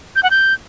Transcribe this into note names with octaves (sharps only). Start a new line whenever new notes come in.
G6
F#5
G6